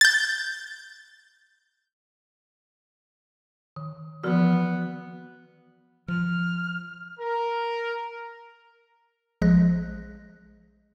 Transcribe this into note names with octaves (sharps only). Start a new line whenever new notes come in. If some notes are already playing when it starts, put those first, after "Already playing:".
G6 A6
D#3
E3 F3 B3 F#4
F3 F6
A#4
A#1 F3 G#3 G#4 F#6 A#6